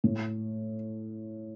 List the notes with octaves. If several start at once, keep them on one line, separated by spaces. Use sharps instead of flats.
A2